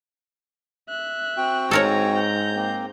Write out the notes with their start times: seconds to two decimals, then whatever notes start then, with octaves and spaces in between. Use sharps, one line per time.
0.89 E5 F#6
1.37 C4 F#4 G5
1.71 G#2 A4 A#4 C#5 G#5 A#5
2.14 A#5 G6
2.56 A#3 C4